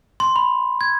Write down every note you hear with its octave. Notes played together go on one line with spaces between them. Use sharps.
C6
B5
G#6